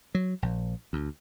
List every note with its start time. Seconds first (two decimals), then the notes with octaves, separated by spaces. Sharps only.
0.15 F#3
0.42 A#1
0.93 D2